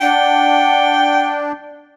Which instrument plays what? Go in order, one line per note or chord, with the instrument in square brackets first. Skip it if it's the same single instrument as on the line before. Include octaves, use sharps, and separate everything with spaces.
[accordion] D4 [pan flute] F#5 [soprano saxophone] G5